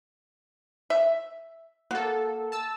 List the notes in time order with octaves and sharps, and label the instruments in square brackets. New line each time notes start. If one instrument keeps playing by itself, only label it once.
[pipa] E5
[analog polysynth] A#3 A4 [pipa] F#4
[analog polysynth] A5 E6